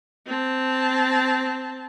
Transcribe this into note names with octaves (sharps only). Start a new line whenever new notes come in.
C4 A5